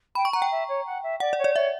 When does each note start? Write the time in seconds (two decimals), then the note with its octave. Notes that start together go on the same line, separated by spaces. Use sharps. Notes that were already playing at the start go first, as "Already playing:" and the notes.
0.15 G5 B5
0.25 C#6
0.33 F#5 A#5
0.42 G5
0.51 E5
0.68 C#5
0.86 F#5
1.03 E5
1.20 D5 F#5
1.33 D5
1.38 C#5
1.44 D5
1.56 C#5 E5